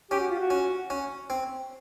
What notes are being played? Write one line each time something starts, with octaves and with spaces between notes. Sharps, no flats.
C#4 G4
F#4
F4
F#4
C#4
C#4
C4